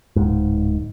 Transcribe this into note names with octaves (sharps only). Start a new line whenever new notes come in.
D1 G#2